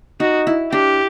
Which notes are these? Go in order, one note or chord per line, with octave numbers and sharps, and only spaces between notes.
D#4 F#4
E4
D4 G4